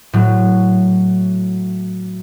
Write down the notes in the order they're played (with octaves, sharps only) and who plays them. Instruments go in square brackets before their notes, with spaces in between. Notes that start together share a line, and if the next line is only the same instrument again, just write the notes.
[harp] A2 F#3